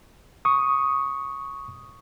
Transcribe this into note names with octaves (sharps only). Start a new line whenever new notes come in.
C#6 D#6